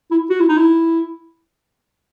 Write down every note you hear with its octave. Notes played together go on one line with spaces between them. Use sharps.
E4
F#4
E4
D#4
E4